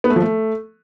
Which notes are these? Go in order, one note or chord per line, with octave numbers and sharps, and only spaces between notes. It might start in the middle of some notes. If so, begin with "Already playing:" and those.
B3
A3
F3
A3